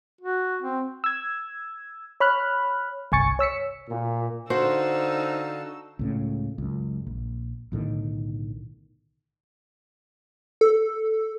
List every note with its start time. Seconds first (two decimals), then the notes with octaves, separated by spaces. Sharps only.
0.21 F#4
0.63 C4
1.04 E6 G#6
2.20 C#5 B5 F6 F#6
3.12 G1 C2 G#5 C#6 A6 C#7
3.39 C#5 E6 B6 C#7
3.90 A#2
4.50 D3 D#4 F#4 C5 F5 F#5 A5 E6
5.99 C#2 A2 C#3
6.58 C#2 F#2
7.07 A#1
7.72 B1 A2 D3 D#3
10.61 A4